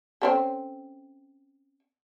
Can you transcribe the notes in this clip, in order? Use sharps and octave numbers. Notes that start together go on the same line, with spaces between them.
C4 C#4 A4